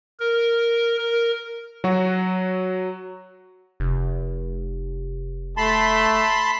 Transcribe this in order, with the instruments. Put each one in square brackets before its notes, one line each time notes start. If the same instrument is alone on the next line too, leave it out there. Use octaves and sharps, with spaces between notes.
[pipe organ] A#4
A#4
[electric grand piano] F#3 F#4
[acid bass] F1
[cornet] A3 [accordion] A5 B5 C6